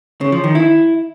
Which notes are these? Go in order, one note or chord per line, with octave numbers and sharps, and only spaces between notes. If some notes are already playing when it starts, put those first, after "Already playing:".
C#3
F3
D#3
E4